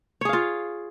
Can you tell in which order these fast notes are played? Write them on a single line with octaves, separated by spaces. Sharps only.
C#5 G#4 F5 F4